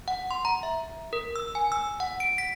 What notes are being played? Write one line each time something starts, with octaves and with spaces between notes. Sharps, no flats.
F#5
C6
A#5
E5
A#4
E6
G#5
E6
F#5
D7
B6